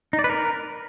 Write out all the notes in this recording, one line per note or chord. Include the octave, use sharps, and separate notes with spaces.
D#4
D5
B4
A#4